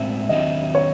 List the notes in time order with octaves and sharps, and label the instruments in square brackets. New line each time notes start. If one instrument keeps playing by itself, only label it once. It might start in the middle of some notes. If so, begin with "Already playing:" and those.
Already playing: [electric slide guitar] A2 G#3 C4 [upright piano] E5
[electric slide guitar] D#3 F#3 C4 [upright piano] D#5
[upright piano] C#5